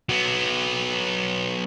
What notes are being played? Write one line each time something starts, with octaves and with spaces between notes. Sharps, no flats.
F#3 B3